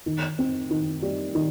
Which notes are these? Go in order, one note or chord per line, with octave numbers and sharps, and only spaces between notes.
D#3
C4
D#3
G3
D#3